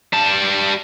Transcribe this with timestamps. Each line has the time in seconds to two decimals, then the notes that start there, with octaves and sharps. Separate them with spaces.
0.13 G3 A5